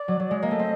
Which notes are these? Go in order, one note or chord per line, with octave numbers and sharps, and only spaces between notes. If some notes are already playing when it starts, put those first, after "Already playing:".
Already playing: D5
F#3
F#3
G#3
A#3 D#5
A3
C4